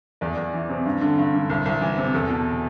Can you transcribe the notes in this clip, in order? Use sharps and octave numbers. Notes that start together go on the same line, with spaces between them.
E2 D5
E2
E3
C3
G2
D3
G2
D3
C2
C2
E3
C3
E2 A4
B2